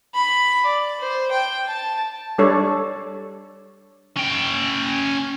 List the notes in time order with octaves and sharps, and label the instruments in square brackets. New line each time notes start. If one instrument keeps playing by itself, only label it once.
[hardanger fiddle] B5
D5
C5
G5
A5
[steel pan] G3 D4 A4 C#5 D5
[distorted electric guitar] C#4 G5